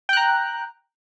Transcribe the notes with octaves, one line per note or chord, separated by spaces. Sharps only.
G5 A#5 F#6